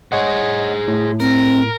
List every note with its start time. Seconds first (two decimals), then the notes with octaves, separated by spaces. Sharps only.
0.12 G#4 C5 C#5 D#5 F#5
0.88 A2
1.20 C4 A#4